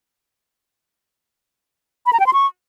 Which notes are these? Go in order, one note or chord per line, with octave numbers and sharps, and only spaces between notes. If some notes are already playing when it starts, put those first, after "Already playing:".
B5
A#5
G5
C6
C#6